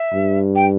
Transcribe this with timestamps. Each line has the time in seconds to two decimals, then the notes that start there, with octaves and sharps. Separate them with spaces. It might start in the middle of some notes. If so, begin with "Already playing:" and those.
Already playing: E5
0.13 G2
0.56 G5